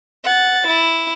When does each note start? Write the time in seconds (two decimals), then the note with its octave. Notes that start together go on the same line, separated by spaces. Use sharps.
0.22 F#5 A6
0.66 E4